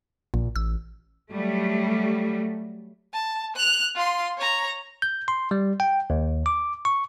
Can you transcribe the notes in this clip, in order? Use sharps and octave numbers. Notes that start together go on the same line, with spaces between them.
A#1 A#2
A1 E6
F#3 G3 A3
A5
F#6 F7
F4 C6
C#5 A#5
G6
C6
G3
G5
D#2
D6
C#6